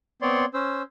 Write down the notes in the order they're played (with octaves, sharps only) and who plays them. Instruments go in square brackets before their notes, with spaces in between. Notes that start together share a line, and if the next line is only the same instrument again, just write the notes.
[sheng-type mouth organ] B3 C4 C#5 D5 C6
C#4 C5 E6